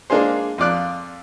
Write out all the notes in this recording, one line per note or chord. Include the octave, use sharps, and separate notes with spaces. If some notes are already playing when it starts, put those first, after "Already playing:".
G#3 A#3 D4 F4 G#4 C5
F2 F4 D5 F#6